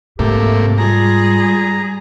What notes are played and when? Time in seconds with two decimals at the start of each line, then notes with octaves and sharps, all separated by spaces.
0.19 G#2 C3 A3 A#3 G4
0.78 G3 F4 G#4 A#5